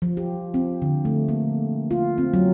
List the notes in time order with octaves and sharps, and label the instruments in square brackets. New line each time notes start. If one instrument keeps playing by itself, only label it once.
[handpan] F3
G4
C4
D3
A3
A#3
F4
C4
F#3